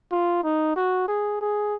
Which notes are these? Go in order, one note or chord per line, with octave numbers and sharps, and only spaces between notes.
F4
D#4
F#4
G#4
G#4